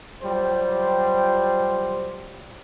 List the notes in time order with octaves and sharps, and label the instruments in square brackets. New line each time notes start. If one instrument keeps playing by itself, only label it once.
[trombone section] F#3 G3 F4 C5